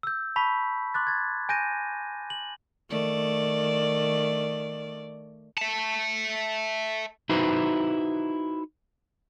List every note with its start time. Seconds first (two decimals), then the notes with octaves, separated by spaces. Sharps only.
0.03 E6 G6
0.36 A5 B5 C#6 B6
0.94 C6 D6 F#6 A6
1.07 G#6 A6
1.49 G#5 G6 A#6 D#7
2.30 F#7
2.90 D#3 A3 D5
5.58 E5 A5
7.29 D#4 E4 F#4 B4 C5